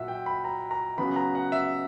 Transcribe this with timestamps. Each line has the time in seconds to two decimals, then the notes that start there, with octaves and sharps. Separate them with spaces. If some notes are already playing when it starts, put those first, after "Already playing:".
Already playing: A#2 F#3 E5 F#5
0.08 G5
0.26 B5
0.44 A#5
0.71 A#5
0.98 C#3 F#3 B3 B5
1.16 A#5
1.35 F#5
1.52 E5